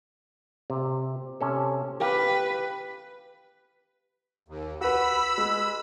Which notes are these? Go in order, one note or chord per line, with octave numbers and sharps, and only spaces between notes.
C3
C3 C#4 A4
G4 B4 F5 G5
D#2
F#4 B4 B5 E6
G#3